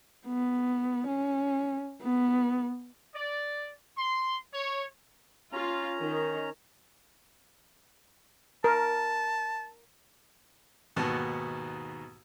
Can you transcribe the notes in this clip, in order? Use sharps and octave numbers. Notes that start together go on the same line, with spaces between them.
B3
C#4
B3
D5
C6
C#5
C#4 F4 A#5
D#3
A#4 A5
D#2 G#2 B2 B3 F#4 A5